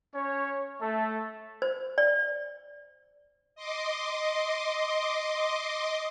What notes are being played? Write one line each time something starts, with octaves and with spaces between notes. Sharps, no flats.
C#4 C#5
A3 A4 E5
C5
D5
D#5 C6 D6